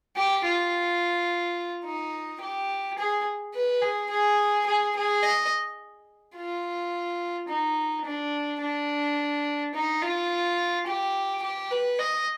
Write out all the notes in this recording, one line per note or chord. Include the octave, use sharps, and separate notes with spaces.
G4
F4
D#4
G4
G#4
B4
G#4
G#4
G#4
G#4
D#5
F4
D#4
D4
D4
D#4
F4
G4
G4
B4
D#5